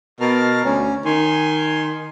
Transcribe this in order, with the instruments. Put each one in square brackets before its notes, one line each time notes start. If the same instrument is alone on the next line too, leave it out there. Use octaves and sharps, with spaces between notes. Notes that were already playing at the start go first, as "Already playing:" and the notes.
[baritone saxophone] B2 [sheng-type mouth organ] A#4 A5 F6
[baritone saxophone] D2 [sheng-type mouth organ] C#4
[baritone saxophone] D#3 [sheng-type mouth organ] G#5 C6